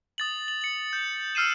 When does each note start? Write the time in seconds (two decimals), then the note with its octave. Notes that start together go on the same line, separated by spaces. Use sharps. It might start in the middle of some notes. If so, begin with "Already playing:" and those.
0.18 D#6 A6 F#7
0.48 F#7
0.61 C#7 F#7
0.93 G6
1.35 E6 F6 C7 D#7 E7